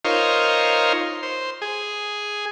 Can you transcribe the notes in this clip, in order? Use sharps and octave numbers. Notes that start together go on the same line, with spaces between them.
D#4 F4 A#4 C5 C#5
C5
G#4